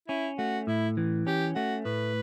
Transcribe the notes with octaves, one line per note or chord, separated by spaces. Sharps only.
C#4 E4
A3 F#4
A2 E4
E3
C#4 G4
A3 F#4
A2 B4